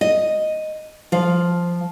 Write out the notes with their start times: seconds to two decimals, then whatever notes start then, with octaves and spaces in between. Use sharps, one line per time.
0.01 D#5
1.12 F3 F5